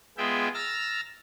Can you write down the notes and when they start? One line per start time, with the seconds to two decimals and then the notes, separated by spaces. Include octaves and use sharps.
0.18 G#3 B3 F4 G#4 E5 G5
0.54 A#5 E6 F6 A6